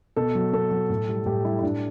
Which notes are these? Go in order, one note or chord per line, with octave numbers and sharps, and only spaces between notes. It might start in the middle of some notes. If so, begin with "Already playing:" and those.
B2 A4
F#3
B2 A4
F#3
A2
G3
A2 G4
G3 E4
E4
A2 D4